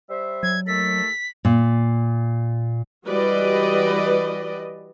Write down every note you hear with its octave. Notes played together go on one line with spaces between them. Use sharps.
G3 C5 E5
F#3 G#6
D#2 A3 A4 B6
A#2
E3 G3 F#4 B4 D5 D#5